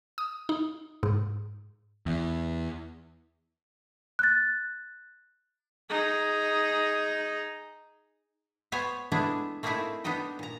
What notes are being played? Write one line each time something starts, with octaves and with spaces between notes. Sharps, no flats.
D#6
D#4
G#2
E2
F#6 A6
D#4 G#4
B3 C5 C#5 G#5
G#3 A3 B3 D4 E4 G#4
A3 A#3 C4 D#4 E4 G#4
B3 D4 D#4 D#5 G5
A#2 A#5